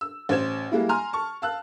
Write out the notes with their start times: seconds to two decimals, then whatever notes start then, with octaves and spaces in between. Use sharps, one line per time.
0.01 E6
0.29 A1 C5 G#6 E7
0.72 G3 G#3 A#3 E4
0.89 G#5 A#5 C6 F6
1.13 A5 C#6
1.42 F5 A5 E6 F#6